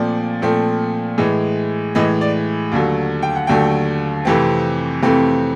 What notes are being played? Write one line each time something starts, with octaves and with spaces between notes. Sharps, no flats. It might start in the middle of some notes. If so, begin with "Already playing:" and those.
Already playing: A#2 F3 A3 C4 D5
A#2 F3 A3 C4
A2 E3 G#3
A2 E3 G#3 D#5
D5
D#2 D3 F#3 A3
G5
F#5
D#2 D3 F#3 A3 G5
F2 C3 E3 A3 C4
F2 C3 E3 A3 C4